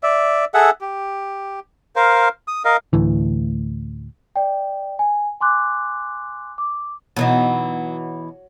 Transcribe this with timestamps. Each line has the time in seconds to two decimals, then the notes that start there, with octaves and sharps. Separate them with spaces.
0.03 D5 E5
0.54 G#4 A4 E5 F#5
0.81 G4
1.96 A#4 C5 F5
2.48 D#6
2.65 A#4 D#5 F5
2.93 D2 A2 E3
4.36 D5 G5
4.99 G#5
5.40 G#5 C6 D6 F#6
6.58 D6
7.16 B2 E3 F#3 D#4